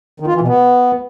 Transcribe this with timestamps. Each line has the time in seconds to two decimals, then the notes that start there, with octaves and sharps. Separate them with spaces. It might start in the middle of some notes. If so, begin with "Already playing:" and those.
0.20 D#3
0.27 F4
0.34 E3
0.41 B2
0.48 B3